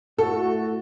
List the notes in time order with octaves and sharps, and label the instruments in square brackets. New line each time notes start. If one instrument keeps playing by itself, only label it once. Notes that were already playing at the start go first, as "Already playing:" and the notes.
[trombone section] A2 A3 F#4 [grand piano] A4